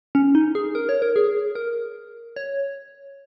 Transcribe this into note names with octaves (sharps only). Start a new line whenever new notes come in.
C#4
D#4
G#4
A#4
C#5
A#4
G#4
A#4
C#5